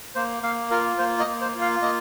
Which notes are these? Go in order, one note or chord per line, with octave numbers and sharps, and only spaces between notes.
A#3 C5
A#3 F5
F4 A#4
A#3 C5
D#5
A#3
C5
F4
F5
A#3 D#5